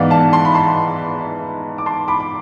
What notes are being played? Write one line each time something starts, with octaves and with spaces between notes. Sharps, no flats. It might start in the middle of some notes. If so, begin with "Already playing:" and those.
Already playing: G#2 E3 B3 D5 F5
F5 A5
A5 C6
B5
A5 C6
D6
A5 C6
B5 D6
B5